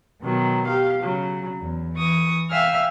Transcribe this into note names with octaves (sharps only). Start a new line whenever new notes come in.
B2 D#3 F#3
G4 F5
C#3 F#3
E2
E3 C#6 D#6
E5 F5 G5 G#5 E6 F6